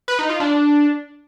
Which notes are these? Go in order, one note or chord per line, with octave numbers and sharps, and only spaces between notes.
B4
D#4
F4
D4